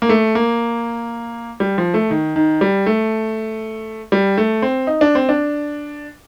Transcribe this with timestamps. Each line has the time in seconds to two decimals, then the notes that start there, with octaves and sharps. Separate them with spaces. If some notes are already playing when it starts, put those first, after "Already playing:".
0.02 A#3
0.09 A3
0.35 A#3
1.60 G3
1.78 F3
1.94 A3
2.10 D#3
2.36 D#3
2.61 G3
2.86 A3
4.12 G3
4.37 A3
4.62 C4
4.87 D#4
5.01 D4
5.15 C4
5.29 D4